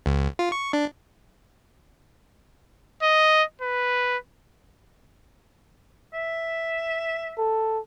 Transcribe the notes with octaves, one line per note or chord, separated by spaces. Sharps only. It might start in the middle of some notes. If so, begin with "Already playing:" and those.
C#2
F4
C#6
D4
D#5
B4
E5
A4